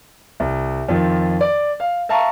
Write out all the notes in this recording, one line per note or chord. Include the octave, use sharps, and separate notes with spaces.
C2
F2 D#3 F4
D5
F5
E5 F5 A5 A#5 C#6